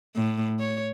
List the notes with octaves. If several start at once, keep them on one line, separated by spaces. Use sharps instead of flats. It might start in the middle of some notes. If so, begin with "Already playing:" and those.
A2
C#5